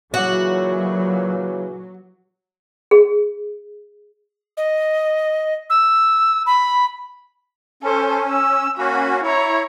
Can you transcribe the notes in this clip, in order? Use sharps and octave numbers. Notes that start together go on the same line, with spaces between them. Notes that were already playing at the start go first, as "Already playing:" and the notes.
A#2 C#3 E3 F#3 F#4 C#5 D6
G#4
D#5
E6
B5
C#4 A4 C5
E6
A#3 C#4 F#4 B5
E4 C#5 A#5